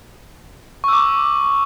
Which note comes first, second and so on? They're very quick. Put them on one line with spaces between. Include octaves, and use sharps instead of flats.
C#6 E6 D6